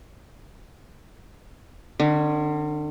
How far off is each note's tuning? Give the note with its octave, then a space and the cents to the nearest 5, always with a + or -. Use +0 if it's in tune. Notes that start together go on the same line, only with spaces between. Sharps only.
D3 +40 C#4 +0